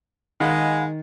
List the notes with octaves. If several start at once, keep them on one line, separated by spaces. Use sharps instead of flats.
D#3 G#3 F5 F#5 B5